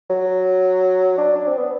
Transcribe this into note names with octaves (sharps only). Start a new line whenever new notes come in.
F#3
D4
D4
C4
B3